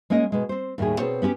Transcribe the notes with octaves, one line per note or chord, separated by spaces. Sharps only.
G#3 A#3 C#4 A#4 D#5
B2 G#3
C4 C5
D#2 A2 D#3 G3 G#4
B2 C4 G#4 C5 C#5 A5
B3 C#4 F#4 G4